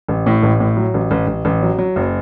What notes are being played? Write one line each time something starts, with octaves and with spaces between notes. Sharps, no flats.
A1
A2
A1
A2
F#3
A1
A1
A1
A1
F#3
F#3
F#1